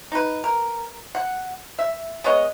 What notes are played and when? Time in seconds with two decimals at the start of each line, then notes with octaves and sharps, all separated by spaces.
0.12 D#4 B4
0.44 A#4
1.15 F#5
1.79 E5
2.24 G#3 B3 C#5 D#5